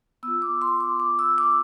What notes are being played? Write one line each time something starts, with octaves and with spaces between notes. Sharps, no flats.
B3 F4 E6
D6
C6
D6
D6
E6
D6